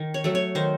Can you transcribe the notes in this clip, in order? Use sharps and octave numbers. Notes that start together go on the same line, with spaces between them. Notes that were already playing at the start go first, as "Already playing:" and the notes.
Already playing: D#3
C#5
F#3 A3
C#5
D#3 C5